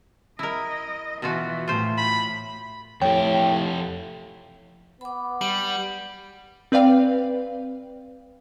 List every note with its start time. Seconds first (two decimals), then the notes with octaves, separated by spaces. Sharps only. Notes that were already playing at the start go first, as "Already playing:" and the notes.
0.39 E4 A#4 D#5
1.22 B2 E3 F4 F#4
1.68 A2 F4 C5
1.98 B5
3.02 F2 A2 G4 C#5 G5
5.01 B3 B5 D6
5.41 G3 F#7
6.72 C4 B4 D5 F5 G5